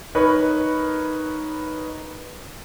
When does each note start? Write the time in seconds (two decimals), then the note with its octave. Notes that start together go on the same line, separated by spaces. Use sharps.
0.15 D#4 A#4 B4 C#5 B5